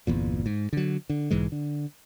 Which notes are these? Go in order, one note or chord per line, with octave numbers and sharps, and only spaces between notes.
G1 E2 A#2
G#2
D3 F#3
D3
B1 G#2 E3 G#3
D3